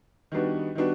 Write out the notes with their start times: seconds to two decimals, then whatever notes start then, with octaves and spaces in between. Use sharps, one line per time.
0.32 D#3 G3 B3 D4 F#4
0.75 D#3 G3 B3 D4 F#4